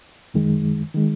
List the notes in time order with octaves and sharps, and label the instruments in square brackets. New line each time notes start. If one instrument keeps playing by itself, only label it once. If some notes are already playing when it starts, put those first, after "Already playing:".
[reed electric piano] F#2 D#3 G#3
D#3 G#3